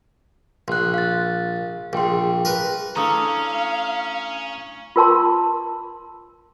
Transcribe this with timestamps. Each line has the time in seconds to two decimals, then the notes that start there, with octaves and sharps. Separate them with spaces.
0.68 A#1 C6 F#6
0.94 F5 A6
1.93 A#1 G#4 G5 C6
2.45 A#4 B4
2.96 A3 C#4 D4 E4 F5 A#5 D#6
4.96 F4 A#4 A5 C6